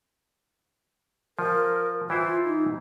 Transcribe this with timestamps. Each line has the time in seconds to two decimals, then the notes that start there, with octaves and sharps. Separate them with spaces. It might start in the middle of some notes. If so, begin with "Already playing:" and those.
1.39 F3 A#4
2.10 E3 E4 F4 C5
2.45 D#4